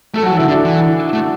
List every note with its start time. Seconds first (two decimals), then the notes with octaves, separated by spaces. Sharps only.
0.14 A3 A4
0.23 F#3
0.26 F#4
0.31 E3
0.37 D3 E4
0.48 D3 D4
0.65 E3
1.13 A3